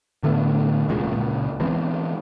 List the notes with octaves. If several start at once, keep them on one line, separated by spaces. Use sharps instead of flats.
A2 D3 A3 B3
E1 C#2 A#2 G#3
C#2 A#2
E3 G#3 B3 C4